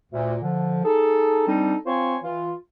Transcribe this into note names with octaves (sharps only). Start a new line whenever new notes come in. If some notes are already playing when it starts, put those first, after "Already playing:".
D2 A#2
D3 F3
D#4 G#4 A4
G3 C4 D4 D#4 A4
C4 F4 C5 C#5 G#5
E3 F4